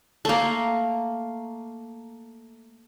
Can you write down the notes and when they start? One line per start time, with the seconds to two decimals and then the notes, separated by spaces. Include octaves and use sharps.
0.25 A3 A#3